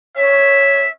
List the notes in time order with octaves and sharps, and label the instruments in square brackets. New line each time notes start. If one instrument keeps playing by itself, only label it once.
[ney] C#5 [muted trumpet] E5